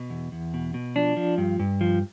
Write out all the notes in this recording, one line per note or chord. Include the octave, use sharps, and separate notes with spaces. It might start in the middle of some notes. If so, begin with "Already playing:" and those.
Already playing: B2
E2
E2
B2
B2
F3 D4
F3
G2
G2
F3